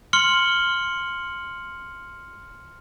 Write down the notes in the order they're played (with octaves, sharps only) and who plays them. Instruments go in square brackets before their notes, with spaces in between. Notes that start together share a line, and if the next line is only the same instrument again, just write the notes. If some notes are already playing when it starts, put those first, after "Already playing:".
[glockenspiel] C6 F6 C#7 F#7 G7